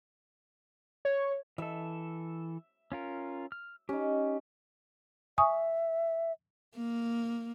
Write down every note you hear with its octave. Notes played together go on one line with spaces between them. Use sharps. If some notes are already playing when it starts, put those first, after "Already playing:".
C#5
E3 A4 E5
C#4 F4 A#4
F6
C#4 D#4 G4
E5 G#5 C#6 D#6
A#3